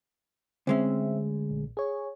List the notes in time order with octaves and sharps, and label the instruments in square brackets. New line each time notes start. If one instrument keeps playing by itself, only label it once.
[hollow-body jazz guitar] D2 G#3 C#4 [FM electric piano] C4 E5
[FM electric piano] A#1
G#4 C#5